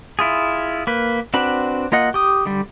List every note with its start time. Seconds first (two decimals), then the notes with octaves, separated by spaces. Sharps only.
0.19 E4 F4 G#4
0.87 A#3 B4
1.34 C4 D4 F#4 B4 B5
1.92 A#3 F4 D#5 F#5
2.14 G4 D#6
2.45 D3 G3